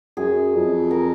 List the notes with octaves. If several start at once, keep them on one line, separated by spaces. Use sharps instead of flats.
F#2 G#4
F2
A#4